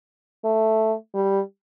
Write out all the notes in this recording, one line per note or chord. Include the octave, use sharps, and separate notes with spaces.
A3
G3